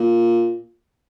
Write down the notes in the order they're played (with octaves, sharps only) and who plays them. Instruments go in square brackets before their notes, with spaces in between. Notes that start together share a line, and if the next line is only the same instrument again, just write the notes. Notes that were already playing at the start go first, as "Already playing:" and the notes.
Already playing: [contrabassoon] A#2